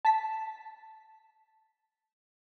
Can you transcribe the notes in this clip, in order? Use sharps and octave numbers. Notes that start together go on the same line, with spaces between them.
A5 B6